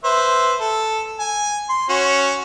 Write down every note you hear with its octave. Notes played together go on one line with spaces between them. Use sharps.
B4 C5 E5
A4
G#5
C6
C#4 F#4